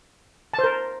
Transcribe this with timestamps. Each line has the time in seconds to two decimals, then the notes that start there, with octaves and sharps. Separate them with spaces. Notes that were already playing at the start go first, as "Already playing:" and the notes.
0.53 A5
0.59 C5
0.64 A#4